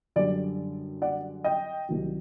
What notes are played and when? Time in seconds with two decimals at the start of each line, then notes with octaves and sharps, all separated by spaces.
0.16 F#2 D3 G3 D5
1.02 D5 F#5
1.44 D#5 G5
1.89 C2 C3 D#3 F#3